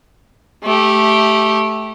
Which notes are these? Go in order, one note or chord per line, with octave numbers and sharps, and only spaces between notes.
A3 G4